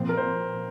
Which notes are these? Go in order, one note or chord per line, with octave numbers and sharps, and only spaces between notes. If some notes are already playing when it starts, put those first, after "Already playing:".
Already playing: A#2 F3 C4
A#4
C5